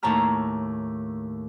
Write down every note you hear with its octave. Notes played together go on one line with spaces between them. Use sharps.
D#2 A2 C#5 A5 A#5 F6